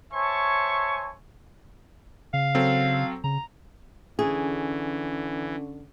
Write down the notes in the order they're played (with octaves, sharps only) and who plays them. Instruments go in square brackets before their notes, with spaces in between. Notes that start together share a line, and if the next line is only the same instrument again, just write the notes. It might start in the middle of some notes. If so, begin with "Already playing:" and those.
[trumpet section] C5 C#5 E5 G#5 A5 C#6
[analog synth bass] C#3 [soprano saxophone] F5
[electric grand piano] F#3 C4 A4
[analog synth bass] C#3 [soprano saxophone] A#5
[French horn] D3 [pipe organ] E3 [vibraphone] C#4 [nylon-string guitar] G#4